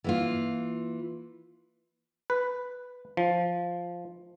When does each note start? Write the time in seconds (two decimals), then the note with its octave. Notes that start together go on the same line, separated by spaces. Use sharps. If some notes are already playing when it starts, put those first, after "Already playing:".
0.04 E3 A#3 F4
2.30 B4
3.17 F3